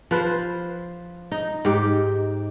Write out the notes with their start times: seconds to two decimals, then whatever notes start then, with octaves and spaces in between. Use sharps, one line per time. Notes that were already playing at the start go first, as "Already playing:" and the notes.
0.11 F3 B4 C5
1.32 D#4
1.65 G#2 G4